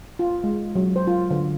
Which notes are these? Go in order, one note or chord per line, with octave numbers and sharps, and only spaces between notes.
F4
G#3
F#3
C5
F4
D3